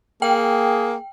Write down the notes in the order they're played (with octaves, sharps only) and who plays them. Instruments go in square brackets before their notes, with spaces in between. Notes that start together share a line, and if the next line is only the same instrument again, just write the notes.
[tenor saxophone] A#3 [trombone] G#4 [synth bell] G5